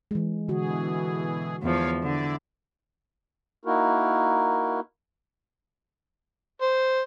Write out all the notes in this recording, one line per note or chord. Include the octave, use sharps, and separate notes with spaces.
E3 G#3
B2 D3 E3 F#4 G#4
E2 F3 C#5 F5
D3 E4 D5
A#3 D#4 E4 F#4 A#4
C5